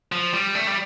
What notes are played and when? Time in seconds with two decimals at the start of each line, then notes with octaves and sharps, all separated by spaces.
0.12 F3
0.33 G3
0.55 A3
0.67 G3